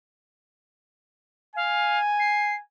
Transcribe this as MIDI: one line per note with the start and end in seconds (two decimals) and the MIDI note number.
1.56 1.99 77
1.56 2.60 80
2.19 2.54 96